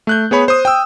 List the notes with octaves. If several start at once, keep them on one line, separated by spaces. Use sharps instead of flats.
A3 F#6 G6
B3 G#4 C#5 B5
C5 D#6
G5 E6